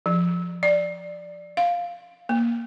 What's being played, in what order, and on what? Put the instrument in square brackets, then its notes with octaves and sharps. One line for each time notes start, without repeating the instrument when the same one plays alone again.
[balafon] F3
D5
F5
A#3